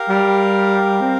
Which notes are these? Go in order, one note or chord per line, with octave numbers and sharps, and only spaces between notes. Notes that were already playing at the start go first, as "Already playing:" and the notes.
Already playing: G4 A#4 F5
G3
C4